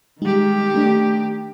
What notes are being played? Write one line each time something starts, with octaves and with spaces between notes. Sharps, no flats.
D#3 G3 G#3 D#4 G4
A3 D4